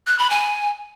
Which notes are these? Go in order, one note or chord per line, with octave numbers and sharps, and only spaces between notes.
F#6
B5
G#5